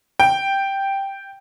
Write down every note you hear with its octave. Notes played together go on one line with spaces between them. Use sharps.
G5